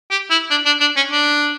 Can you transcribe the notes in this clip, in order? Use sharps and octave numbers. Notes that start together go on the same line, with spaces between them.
G4
E4
D4
D4
D4
C#4
D4